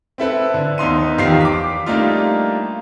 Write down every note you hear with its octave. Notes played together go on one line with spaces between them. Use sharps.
C4 E4 A4 B4
D3
D#2 B3 D#4 C6 D#7
E2 D#3 F3 F4 G4 C7
D6 B6
G3 A3 A#3 D4 D#4 F4